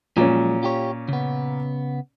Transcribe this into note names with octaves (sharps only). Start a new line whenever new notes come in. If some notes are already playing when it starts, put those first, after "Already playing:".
A#2 F3 F#3 G#3 C#4
F4 G4 C#5
C#3 B3